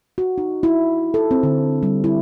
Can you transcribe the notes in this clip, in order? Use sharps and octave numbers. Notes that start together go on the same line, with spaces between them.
F#4
D#4
E4
A4
C4
D3
G3
E4